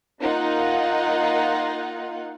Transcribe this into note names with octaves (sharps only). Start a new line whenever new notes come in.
A#3 D#4 F4 F#5